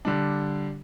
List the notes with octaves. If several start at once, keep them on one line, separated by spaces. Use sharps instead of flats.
D3 G3 D4